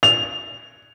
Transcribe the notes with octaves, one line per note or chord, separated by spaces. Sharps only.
F7